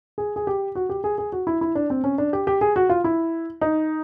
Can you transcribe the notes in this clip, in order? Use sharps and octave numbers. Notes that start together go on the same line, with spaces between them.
G#4
G#4
G4
F#4
G4
G#4
G#4
F#4
E4
E4
D4
C4
C#4
D4
G4
G4
G#4
F#4
F4
E4
D#4